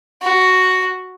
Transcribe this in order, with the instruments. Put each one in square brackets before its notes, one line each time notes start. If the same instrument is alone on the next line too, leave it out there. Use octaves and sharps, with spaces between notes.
[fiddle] F#4